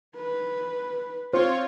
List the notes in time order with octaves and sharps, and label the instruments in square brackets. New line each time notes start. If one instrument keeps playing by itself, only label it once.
[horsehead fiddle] B4
[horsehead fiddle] C4 [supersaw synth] F4 C#5 [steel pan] C5